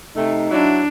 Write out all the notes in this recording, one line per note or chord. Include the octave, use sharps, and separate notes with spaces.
C3 A3 D#4
F#3 D4 E4